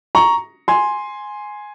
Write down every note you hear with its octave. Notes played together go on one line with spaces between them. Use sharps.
A#5 C#6
G#5 C6